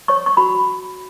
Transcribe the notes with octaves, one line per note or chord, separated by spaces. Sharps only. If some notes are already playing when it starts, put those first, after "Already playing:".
C#5 C#6
C#6
F#4 B5